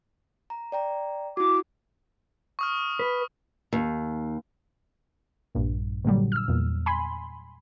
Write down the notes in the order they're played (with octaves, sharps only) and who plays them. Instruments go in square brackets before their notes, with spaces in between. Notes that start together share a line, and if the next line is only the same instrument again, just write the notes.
[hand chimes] A#5
D5 G5 A#5
[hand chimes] E4 F#4 [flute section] D6
[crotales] C#6 D#6 F6
[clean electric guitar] B4
[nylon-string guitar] D#2
[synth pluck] A#1 G2 A#2
A#2 D3 F#3 G3
E6 F6
E2 A#2
G#5 B5 C6